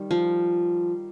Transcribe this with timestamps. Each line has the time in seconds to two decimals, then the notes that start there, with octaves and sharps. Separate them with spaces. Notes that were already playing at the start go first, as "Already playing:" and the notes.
Already playing: D#3 G3
0.11 F3